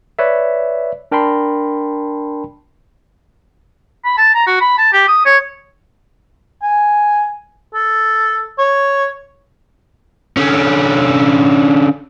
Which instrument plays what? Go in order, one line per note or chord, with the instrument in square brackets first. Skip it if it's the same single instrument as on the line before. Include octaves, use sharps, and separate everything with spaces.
[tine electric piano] B4 C#5 D5 E5
D4 A#4 G5 A5 B5 C6
[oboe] B5
A5
A#5
F#4
B5
A5
G4
D#6
C#5
[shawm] G#5
A4
C#5
[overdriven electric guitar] D3 C#4